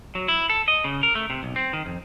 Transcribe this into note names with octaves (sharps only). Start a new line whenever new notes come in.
F#3
E4
A4
D#5
C#3
A#4
A3
C3
B1
C4
D#3
F2